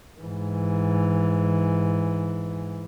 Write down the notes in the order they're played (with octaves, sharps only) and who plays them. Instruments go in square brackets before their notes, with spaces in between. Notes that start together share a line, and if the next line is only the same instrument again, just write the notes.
[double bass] G#2 E3